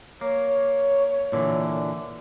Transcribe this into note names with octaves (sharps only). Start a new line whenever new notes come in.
A#3 C#5
A#2 D3 E3